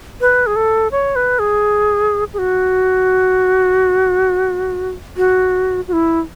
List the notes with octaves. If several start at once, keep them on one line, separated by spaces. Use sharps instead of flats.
B4
G#4
A4
C#5
B4
G#4
G#4
F#4
F#4
F#4
E4